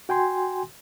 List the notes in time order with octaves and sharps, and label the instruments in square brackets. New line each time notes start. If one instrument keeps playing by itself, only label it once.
[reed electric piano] F#4 G5 G#5 C6